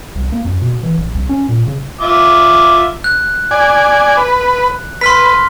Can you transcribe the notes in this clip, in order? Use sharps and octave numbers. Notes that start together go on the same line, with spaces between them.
C2
A#3
F#2
B2
E3
A#1
C2
C#4
A#2
C#3
F4 E5 D6
F#6
D5 G#5
B4
B4 C6 F6 B6